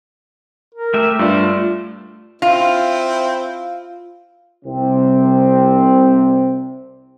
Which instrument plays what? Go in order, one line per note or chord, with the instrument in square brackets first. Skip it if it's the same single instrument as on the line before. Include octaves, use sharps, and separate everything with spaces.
[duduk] A#4
[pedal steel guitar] A3 G4 E5
[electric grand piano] G2 D5 [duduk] F4
[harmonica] C4 E4 [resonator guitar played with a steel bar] F4 [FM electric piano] F5
[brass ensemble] C2 C3 C4